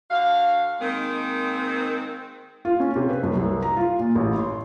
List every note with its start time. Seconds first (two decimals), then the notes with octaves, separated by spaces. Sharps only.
0.11 D3 F#4 F5
0.80 D#3 G#3 A#3 C4
2.65 F4
2.80 C#4
2.96 C3
3.09 B4
3.23 F#2
3.37 C2
3.62 A#5
3.77 F4
3.99 A#2
4.15 A1
4.39 C6